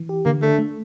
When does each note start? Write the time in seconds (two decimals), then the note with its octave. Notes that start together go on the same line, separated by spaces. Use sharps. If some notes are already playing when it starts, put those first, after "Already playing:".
Already playing: E3
0.09 G4
0.26 D3 A#3
0.42 A3 D4
0.59 A3